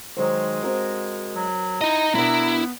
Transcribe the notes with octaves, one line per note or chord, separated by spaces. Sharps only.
D#3 F#3 G#3 C5
C4 F#4 A#4
F#3
D#4 E4 D#5 A#5
B2 B3 D4 E4 A#4